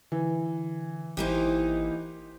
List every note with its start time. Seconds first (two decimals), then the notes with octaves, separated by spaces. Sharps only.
0.12 D3 E3
1.17 G#1 E3 A#3 D#4 G4 C5